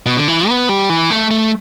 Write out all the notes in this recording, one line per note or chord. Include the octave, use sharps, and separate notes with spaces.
B2
D3
E3
B3
G3
E3
A3
A3